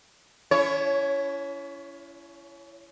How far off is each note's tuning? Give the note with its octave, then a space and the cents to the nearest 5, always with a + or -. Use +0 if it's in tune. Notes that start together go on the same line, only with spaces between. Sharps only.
C#4 +40 E4 +35 C#5 +0